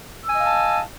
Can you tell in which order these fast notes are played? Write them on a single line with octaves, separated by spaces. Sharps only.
E6 G#5 D#5 F5 A5